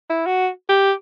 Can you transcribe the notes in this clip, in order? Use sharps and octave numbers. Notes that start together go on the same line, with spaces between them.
E4
F#4
G4